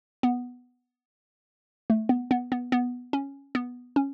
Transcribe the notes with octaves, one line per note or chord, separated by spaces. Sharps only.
B3
A3
B3
B3
B3
B3
C#4
B3
C#4